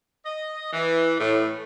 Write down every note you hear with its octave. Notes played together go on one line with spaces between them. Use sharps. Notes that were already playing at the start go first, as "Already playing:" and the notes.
D#5
E3
A2